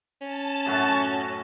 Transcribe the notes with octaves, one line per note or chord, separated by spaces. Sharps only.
C#4 A5
F#2 A2 F#4